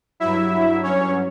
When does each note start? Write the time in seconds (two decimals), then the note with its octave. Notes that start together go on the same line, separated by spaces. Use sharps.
0.20 G2 F#3 E4 E5
0.83 C#4 C#5